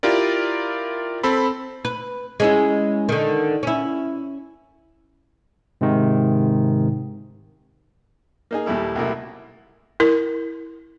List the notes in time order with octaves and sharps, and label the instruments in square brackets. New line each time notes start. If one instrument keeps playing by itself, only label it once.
[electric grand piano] E4 F4 G4 A#4 D5
C4 A4 B5
[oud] B4
G#3 C#4 E4
D3 D#3
C#4 E4
[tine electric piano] G#2 C3 D#3
[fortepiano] A#3 D#4 G#4
D#2 A#2 G3 E4 A4
B1 C3 A3 A#3 E4
[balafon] E4 A#4